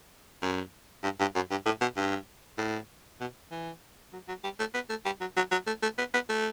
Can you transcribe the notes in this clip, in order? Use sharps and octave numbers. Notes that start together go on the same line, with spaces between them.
F#2
G2
G2
F#2
G2
A2
B2
G2
A2
B2
E3
F#3
F#3
G3
A3
B3
A3
G3
F#3
F#3
F#3
A3
A3
B3
B3
A3